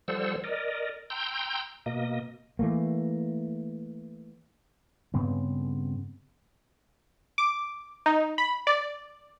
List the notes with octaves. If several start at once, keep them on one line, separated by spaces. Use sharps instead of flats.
F3 G3 A4 C5 F#5 E6
A#4 D5 D#5
G5 A#5 C6 E6 G6
B2 A#3 D#5
E3 A3 A#3
G2 C#3 B3 C4
D6
D#4
B5
D5